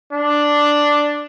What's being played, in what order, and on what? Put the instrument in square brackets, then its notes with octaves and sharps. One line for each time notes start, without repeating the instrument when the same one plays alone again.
[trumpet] D4